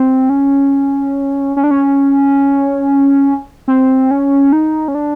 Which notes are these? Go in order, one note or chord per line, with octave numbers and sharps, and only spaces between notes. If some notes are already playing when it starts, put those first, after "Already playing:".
Already playing: C4
C#4
C#4
D4
C#4
C4
C#4
D#4
C#4
D4